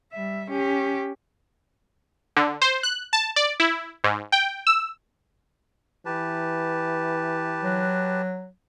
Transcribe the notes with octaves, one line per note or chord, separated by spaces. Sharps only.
G3 E5
C#4 G4
D3
C5
F#6
A5
D5
E4
G#2
G5
E6
E3 G4 B4 A5
F#3